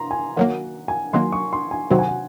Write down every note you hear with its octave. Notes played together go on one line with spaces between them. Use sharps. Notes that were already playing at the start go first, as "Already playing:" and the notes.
Already playing: A#5 C6
G#5
D#3 F#3 A#3 F#5
G#5
D#3 F#3 A#3 C6
C#6
C6
G#5
C3 D#3 F#3 C4 F#5
G#5
F#5